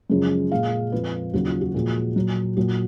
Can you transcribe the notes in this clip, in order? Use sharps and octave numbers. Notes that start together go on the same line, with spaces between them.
F#2 C#3 F3 G#3
A#2 G#3 F5
F2 F3 G#3 B4
D#2 C#3 F#3 F#4
F4
F#4
A#2 F3 G#3
A#2 F#3
A#2 F#3 F#4